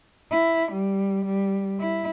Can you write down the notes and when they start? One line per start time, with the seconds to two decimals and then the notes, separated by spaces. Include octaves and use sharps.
0.31 E4
0.72 G3
1.25 G3
1.79 E4